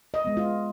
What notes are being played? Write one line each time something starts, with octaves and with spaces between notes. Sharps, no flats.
D#5
G#3 B3
F4